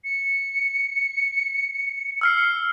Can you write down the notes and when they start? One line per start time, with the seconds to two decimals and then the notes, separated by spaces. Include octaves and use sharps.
0.04 C#7
2.21 E6 F6 C7